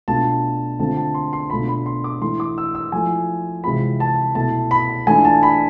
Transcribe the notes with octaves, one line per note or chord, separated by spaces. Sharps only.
B2 A3 D4 F4 A5
D3 A3 C4 F4 A5
A5
C6
C6
B2 A3 D4 F4 B5
B5
C6
D6
E3 A3 E4 C6
D6
E6
E6
F3 A3 E4 G#5
C3 E3 G#3 C4 F4 B5
A5
B2 A3 E4 A5
B5
E3 A3 D4 F4 G#5
A5
B5